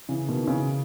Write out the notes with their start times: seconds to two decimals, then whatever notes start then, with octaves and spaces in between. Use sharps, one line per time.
0.09 C#3 E3
0.28 B2 D#3
0.47 C#3 E3